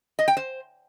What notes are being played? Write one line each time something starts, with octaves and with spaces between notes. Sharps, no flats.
D#5
G5
C5